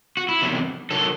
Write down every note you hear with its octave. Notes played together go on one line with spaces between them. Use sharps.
F#4
E4
E2 C3 D#3 F#3
D#3 F#3 A4